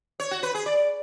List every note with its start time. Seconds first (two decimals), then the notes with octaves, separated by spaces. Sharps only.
0.20 C#5
0.31 F#4
0.43 B4
0.54 G#4
0.66 D5